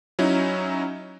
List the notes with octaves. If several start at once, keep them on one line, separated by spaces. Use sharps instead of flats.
F#3 C#4 D#4 E4